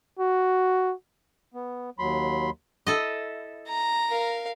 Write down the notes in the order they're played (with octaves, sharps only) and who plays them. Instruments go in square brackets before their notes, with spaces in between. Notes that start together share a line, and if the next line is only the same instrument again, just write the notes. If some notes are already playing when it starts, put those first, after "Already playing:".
[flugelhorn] F#4
[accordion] B3
D#2 F#3 B5 C6
[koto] E4 A4 D#5
[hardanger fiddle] A#5
[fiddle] A#4 F5